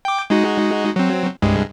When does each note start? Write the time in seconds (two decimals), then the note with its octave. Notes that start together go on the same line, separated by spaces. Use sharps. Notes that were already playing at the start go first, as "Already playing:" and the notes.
0.05 G5 D6
0.30 G#3 D#4 F#4
0.96 F#3 C4
1.42 C2 G2 G#3